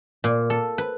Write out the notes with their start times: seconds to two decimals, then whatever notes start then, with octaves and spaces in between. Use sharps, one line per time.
0.24 A#2
0.50 A4
0.78 B4